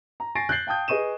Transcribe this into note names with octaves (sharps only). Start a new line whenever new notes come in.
A#5
G#5 C#6 A6 A#6 C7 D7
F#6 G6 A6 C7 F#7
F5 G5 A5 D#6 G6
G#4 B4 D#5 C#6 D#7 E7